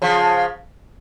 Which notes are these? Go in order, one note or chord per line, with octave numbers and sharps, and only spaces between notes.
C#3 F3